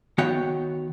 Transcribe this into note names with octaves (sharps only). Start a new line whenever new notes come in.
D#3 B3 F#4 C#5 F#5 G5